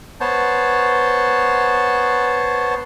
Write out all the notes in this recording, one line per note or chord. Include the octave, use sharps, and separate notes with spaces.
B3 C5 C#5 A5